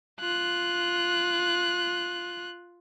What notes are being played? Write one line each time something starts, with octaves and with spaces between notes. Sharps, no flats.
F4 F#6